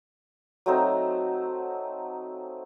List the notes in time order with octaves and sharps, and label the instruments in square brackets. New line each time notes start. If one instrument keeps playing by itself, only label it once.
[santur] F#3 A3 C4 D#4